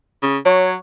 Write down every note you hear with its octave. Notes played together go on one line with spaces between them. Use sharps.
C#3
F#3 C#5